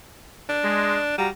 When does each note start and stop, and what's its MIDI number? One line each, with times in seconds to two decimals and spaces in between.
0.49 1.16 62
0.63 0.96 56
1.18 1.29 55
1.18 1.28 66
1.18 1.28 77
1.18 1.28 82